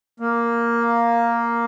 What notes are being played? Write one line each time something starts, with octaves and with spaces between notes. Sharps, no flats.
A#3